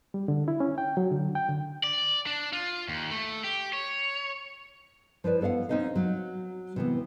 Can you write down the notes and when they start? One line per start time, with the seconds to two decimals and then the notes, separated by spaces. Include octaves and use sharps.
0.14 G3
0.28 D3
0.48 E4
0.60 C#4
0.78 G5
0.97 F#3
1.11 D3
1.35 G5
1.49 D3
1.84 D5
2.27 D4
2.53 F4
2.88 D#2
3.11 A3
3.44 G4
3.73 C#5
5.24 F3 E4 B4 D5
5.41 B3 A4 D5 F5 F#5
5.69 C4 C#4 D#4 D#5 F5
5.96 F#3
6.76 C3 E3 B3